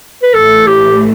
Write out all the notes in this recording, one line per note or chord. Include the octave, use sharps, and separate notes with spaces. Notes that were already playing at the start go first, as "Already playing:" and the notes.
B4
A1 A2 E3 A3 A4
G4